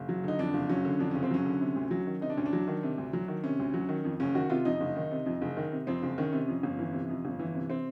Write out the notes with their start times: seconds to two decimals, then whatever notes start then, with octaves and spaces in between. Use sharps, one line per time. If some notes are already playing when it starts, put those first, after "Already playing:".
Already playing: F#1
0.09 F#3
0.24 D3 D#4
0.39 F2 D4
0.54 F#1
0.69 F#3 C#4
0.85 D3
0.99 F2 D4
1.11 F#1 C#4
1.23 C4
1.31 F#3 C#4
1.46 D3
1.61 C3
1.76 D2
1.91 F#3
2.07 D#3
2.22 C3 D#4
2.30 D4
2.37 D2 C#4
2.46 D4
2.53 F#3
2.68 D#3
2.83 C3
2.98 D2
3.13 F#3
3.28 D#3
3.44 C3 C#4
3.59 D2
3.74 F#3
3.89 D#3
4.04 F2
4.20 F#1 C#4
4.35 D#3 F#4
4.50 C3 F4
4.65 F2 D#4
4.80 F#1
4.96 D#3
5.11 C3
5.26 F2
5.42 F#1
5.57 D#3
5.72 C3
5.87 F2 C4
6.03 F#1
6.18 D#3 C#4
6.33 C3
6.48 F2
6.63 G1
6.79 E3
6.93 C3
7.09 F2
7.25 G1
7.39 E3
7.55 C3
7.70 C4